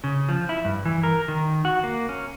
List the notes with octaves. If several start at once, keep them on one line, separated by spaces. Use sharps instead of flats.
C#3
F3
E4
G2
E3
A#4
D#3
F#4
A#3
C#4